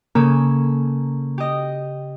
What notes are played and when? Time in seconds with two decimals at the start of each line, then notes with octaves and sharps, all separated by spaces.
0.15 C#3 A#3 C#4 A4
1.38 G4 D#5